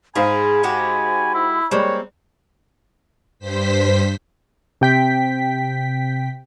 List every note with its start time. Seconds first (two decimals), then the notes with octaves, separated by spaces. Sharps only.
0.15 G#2 G#4 C5 F5 G#5 B5
0.63 G#3 F#4 G4
1.34 E4
1.71 G3 G#3 A#3 C4 C#5
3.39 G2 C5 B6
4.81 C3 G5 B6